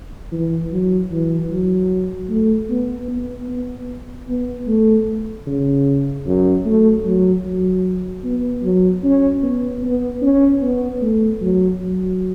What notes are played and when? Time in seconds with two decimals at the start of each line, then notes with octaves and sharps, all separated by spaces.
0.32 E3
0.71 F#3
1.11 E3
1.50 F#3
2.29 A3
2.69 B3
3.09 B3
3.49 B3
4.28 B3
4.68 A3
5.47 C#3
6.26 F#2
6.66 A3
7.05 F#3
7.45 F#3
8.24 B3
8.63 F#3
9.04 C#4
9.43 B3
9.83 B3
10.22 C#4
10.62 B3
11.02 A3
11.41 F#3
11.80 F#3